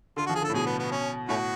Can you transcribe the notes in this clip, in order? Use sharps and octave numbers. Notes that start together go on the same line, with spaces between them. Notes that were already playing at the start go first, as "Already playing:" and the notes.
D3 F4
F3 F#4
G#4
D3 A4
A2
B2 G#4
B3
B3
C#4
A2 A3 C#4 F#4